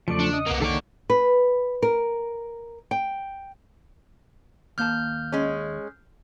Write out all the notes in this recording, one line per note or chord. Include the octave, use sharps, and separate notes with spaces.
E2 C#3 F3 A3 D5 C#7
D4
D#5 D#6
C2 F#2 A#3 B3
D#3 A#3 A4 C#5 D5
B4
A#4
G5
D#2 A#3 A5 F6 G6
G#3 C#4